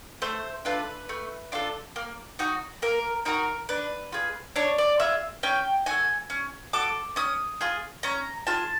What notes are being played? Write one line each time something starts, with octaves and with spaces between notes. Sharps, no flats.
A3 C5
D4 F4 A4 B4
A3
D4 F4 A4
A#3
D#4 F#4
A#3 A#4
D#4 F#4 A#4
D4 B4
F4 G#4
D4 C#5
D5
F4 G#4 E5
C#4 G5
F#4 A4 G#5
C#4
F#4 A4 D6
C#4 D#6
F4 G#4
C#4 A#5
F4 G#4 A5